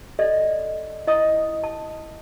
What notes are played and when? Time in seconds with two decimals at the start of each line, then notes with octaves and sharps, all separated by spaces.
0.19 A4 D5 D#5
1.07 E4 D#5 F#5 D#6
1.64 A5